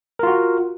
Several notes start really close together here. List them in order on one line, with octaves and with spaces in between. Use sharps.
A#4 F4 F#4